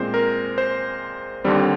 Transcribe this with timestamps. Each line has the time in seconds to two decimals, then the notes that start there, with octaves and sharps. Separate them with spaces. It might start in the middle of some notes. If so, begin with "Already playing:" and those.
Already playing: A#2 G#3 C4 C5
0.14 A#4
0.58 C5
1.44 D#2 D3 G3 C4